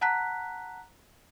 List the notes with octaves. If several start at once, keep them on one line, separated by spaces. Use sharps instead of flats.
F#5 A5 A#5 F#6 B6